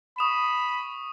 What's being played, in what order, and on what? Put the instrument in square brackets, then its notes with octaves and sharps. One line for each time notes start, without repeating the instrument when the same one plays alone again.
[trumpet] B5 [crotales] C#6 D#6 E7